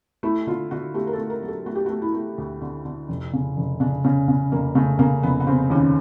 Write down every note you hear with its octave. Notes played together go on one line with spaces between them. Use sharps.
A3 E4
D3 F4
D3 F#4
A3 G4
A#4
A3 A4
A#4
F#3
A4
A3 F#4
G4
A3 F#4
E4
A3
D2
D3
D3
F1
C#3
F1
C#3 D4
C#3 C#4
C#3
F1 A#3
C#3 A3
C#3 A#3
F1 B3
B3
C#3 C4
D#2 C#4